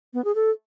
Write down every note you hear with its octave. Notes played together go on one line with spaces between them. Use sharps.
B3
G#4
A4